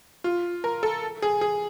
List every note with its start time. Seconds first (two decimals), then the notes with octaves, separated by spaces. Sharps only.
0.24 F4
0.64 A#4
0.83 A4
1.22 G#4
1.41 G#4